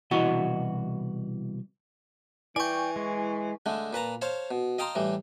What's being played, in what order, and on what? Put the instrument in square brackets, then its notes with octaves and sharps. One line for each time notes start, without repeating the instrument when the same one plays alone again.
[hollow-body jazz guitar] C2 B2 E3 F#4 D#5
[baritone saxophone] E3 [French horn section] E4 [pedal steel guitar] D5 G5 [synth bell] G#5 C#6
[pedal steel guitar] G#3
[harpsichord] D3 G#3 A3
A#2 B4 A5 A#5
C5 C#5 F5 A5
B2
D#5 F5 G5 A5 A#5 C6
A2 E3 G3